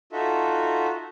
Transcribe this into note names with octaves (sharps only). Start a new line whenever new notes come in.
D#4 F4 F#4 A4 E5